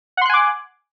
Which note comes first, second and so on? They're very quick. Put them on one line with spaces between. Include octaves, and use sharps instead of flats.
F#5 C6 F#6 G#5 D6